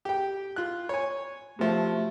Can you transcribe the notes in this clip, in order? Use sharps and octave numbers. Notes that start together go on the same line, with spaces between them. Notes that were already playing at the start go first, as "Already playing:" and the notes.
G4 G5
F4 F#6
C#5 G#5
C3 F3 F#3 A3